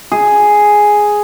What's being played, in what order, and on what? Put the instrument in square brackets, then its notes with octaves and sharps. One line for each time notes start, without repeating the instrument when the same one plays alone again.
[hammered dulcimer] G#4